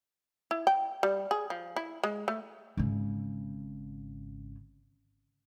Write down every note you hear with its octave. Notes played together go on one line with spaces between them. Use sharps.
E4
G5
G3
G#4
F3
E4
G#3
A3
G#1 C#3